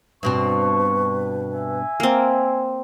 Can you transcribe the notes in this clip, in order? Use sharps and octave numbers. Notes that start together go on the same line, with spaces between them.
G2 B2 C4 B4 C#6
E5 G#5
A#3 C4